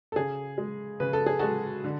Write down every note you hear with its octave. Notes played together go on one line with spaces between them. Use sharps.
A4
C#3 G#4
G#3
C#3 B4
A4
G#4
G#3 F#4 A4
D3